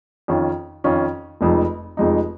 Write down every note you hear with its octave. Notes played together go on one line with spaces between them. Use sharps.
F2 D#3 C#4 F4
F2 D#3 C#4 F4
F1 F2 F3 G#3 D#4
F1 F2 F3 G#3 D#4